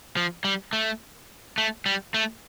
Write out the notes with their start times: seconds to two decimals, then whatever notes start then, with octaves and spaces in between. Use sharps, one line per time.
0.17 F3
0.44 G3
0.73 A3
1.58 A3
1.86 G3
2.14 A3